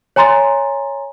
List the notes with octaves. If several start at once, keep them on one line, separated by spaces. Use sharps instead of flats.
C#5 G#5 A#5 C6 A6